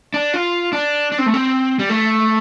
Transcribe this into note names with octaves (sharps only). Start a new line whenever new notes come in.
D4
F4
D4
D4
C4
A3
C4
G3
A3